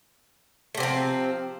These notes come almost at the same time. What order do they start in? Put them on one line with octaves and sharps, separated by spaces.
A3 C3 C4 F3